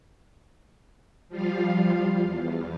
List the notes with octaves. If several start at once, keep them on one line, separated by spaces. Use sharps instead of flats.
F3 G3 F4 F5
E2